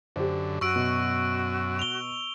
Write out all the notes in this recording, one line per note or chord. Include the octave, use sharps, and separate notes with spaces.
F#2 D3 G4 C5
F#2 F#4 C#6 E6 D7
B2
F7 G7